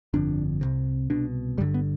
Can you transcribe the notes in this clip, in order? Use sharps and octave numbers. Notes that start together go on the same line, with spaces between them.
G1 F2 D3 D4
C2 C3
C2 B2 D4
G1 G2 D3 G3
B3